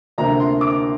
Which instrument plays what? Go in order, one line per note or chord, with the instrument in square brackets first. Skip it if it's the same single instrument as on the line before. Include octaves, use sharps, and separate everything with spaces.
[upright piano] D2 C3 A#3 D4 A#5
C6
D6